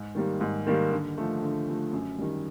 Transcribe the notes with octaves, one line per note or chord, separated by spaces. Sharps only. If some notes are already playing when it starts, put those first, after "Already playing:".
Already playing: G#2
D#3 G3 A#3
G#2
D#3 G3 A#3
D3
F3 A3
D3
F3 A3
F#2
D#3 G3